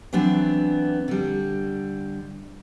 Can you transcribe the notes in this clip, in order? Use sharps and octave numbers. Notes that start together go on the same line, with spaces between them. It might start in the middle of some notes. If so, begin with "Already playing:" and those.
E3 F#3 B3 C4 D4
D3 G3